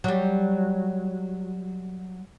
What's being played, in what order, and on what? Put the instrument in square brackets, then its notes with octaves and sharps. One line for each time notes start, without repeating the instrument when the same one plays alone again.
[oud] F#3 G3